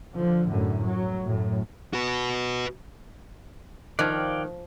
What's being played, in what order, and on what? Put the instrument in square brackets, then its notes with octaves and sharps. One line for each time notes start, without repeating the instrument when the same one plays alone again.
[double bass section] D3 F3
F#2 A2 D3
F#3
F#2 A2
[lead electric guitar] F#4 B4
[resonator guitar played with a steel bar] D#3 [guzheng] F3 [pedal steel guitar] D5 F5 G5 [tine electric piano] F#6 G#6